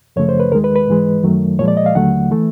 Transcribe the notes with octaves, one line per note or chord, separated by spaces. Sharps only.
F#2 C#3 F3 A3 C#5
C5
B4
D#2 D#3 G#3 A#4
B4
B4
G#2 E3 G#3
F#2 D#3 F#3 A3
A#2 F3 G#3 C#5
D5
D#5
F5
D#2 D3 F#3 A3 F#5
E3 A3